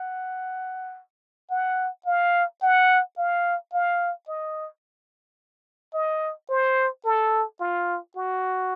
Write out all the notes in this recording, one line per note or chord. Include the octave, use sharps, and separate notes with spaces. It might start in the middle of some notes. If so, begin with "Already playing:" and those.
Already playing: F#5
F#5
F5
F#5
F5
F5
D#5
D#5
C5
A4
F4
F#4